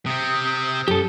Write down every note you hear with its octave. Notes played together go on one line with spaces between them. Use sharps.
C3 C4 D#6
F#2 G4 A4